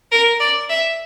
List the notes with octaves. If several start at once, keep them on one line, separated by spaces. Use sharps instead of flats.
A#4
D5
E5